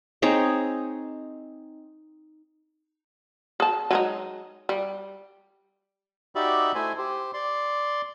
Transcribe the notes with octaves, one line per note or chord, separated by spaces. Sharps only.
C4 D#4 G#4 C#5
G#4 A5
F#3 G#3 D#4
G3
D#4 F#4 G4 D5 E5 B5
A3 E4 C5 G#5
G4 C5
D5 C6